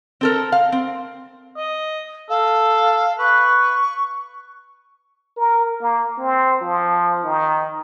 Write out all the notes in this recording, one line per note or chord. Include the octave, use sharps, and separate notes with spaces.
C4 A4 A#4
F5
C4
D#5
A4 F5
B4 C#6
A#4
A#3
C4
F3
D#3